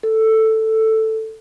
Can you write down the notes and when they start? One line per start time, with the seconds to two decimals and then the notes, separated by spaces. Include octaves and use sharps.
0.03 A4